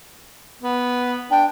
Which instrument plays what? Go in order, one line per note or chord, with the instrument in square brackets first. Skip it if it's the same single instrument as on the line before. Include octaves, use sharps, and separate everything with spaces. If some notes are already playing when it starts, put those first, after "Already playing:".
[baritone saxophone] B3
[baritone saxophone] D4 [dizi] G5